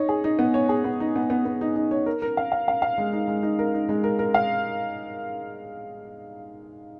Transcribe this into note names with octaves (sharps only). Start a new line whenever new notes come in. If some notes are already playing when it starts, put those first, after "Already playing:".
Already playing: D#4 C#5
G#4
D#4
B3
C#5
G#4
B3
D#4
B3
B3
B3
D#4
D#4
C#5
A#4
A#4
F5
F5
F5
F5
G#3
D#4
G#3
D#4
A#4
D#4
G#3
A#4
A#4
F5